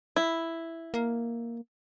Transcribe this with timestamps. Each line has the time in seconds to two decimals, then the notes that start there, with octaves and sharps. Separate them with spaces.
0.16 E4
0.94 A#3